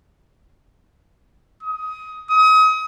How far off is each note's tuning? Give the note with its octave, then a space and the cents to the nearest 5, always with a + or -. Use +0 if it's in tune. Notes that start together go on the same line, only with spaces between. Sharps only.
D#6 +20
D#6 +35